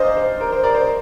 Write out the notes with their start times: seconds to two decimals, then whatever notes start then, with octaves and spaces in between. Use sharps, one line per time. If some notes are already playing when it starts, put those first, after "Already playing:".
Already playing: C5 D5 D#5 F5 G#5 A#5 D6 D#6
0.17 C5
0.41 A#4
0.52 C5
0.63 A#4 D5
0.74 C5